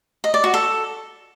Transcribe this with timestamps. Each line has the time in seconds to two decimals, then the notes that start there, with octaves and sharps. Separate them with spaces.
0.24 D#5
0.34 D5
0.44 F#4
0.54 A4